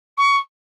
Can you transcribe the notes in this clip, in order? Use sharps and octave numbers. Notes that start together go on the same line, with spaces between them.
C#6